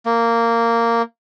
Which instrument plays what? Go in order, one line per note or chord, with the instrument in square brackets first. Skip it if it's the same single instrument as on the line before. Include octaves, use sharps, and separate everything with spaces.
[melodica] A#3